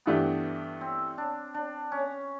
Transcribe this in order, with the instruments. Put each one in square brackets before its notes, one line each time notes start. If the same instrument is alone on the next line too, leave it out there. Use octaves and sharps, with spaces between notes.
[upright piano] G2 E3 A3 D4 G4 [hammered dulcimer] B3
[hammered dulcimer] C4
D4
D4
C#4